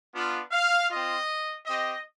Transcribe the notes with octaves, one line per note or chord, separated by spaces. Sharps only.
B3 D4 F4
F5
C4 F4 D#5
C4 G4 D#5